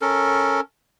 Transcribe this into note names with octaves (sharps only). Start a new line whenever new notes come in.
C#4 A4 A#4